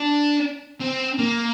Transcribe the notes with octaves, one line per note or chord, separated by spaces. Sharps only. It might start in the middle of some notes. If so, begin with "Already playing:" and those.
Already playing: D4
C4
A#3